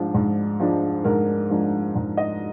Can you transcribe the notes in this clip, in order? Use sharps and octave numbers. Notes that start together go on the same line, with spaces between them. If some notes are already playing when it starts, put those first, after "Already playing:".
Already playing: G#2 F3 G#3 D4
G#2
F3 G#3 D4
G#2 A#4
F3 G#3 D4
G#2
D#5